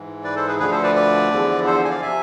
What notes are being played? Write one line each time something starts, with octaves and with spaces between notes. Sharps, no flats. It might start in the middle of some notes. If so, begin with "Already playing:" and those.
Already playing: G#2 E3
B4 D5
A4 C5
G#4 B4
D2 D3 F3 G#4 B4
A4 C5
B4 D5
B4 D5
E2 D3 F3
A4 C5
G#5
D5 F5
C3 F3 E5 G#5